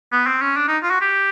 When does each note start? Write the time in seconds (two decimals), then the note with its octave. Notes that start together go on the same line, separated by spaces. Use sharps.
0.12 B3
0.27 C4
0.42 C#4
0.57 D4
0.68 D#4
0.83 F4
0.91 F#4
1.01 G4